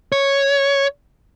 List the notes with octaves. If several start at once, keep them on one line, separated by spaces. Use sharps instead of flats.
C#5